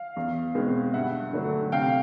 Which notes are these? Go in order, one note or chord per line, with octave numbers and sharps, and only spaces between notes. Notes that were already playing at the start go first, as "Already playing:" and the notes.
Already playing: F5
E2
B2 G#3 C4
G2 E5 F#5
D3 F#3 A3
C3 F5 G5